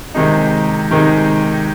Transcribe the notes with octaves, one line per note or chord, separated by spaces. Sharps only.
C3 D#3 G#3 D#4
C3 D#3 G#3 D#4